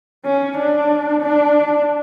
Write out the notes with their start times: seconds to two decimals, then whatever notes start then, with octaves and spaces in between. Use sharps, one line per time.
0.25 C#4
0.57 D4
1.22 D4